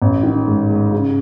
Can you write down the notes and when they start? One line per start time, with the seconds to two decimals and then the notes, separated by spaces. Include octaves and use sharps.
0.02 A1
0.23 D#3
0.47 G#2
0.70 G#2
0.91 C#3